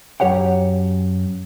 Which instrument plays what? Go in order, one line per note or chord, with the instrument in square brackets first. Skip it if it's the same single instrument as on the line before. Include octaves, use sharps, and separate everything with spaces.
[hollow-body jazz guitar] F#2 G4 C#5 F#5 G5